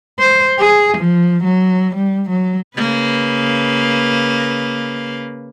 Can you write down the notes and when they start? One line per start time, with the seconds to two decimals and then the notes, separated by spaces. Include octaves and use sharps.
0.19 C5
0.59 G#4
0.98 F3
1.44 F#3
1.96 G3
2.30 F#3
2.77 C#3 A#3 B4